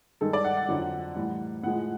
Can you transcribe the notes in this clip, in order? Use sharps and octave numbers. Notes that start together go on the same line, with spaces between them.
G2 D#3 G#3 A4
D5
F#5
F#5
F2 D3 F#3
A2 E3 G3
A2 F3 G#3 F#5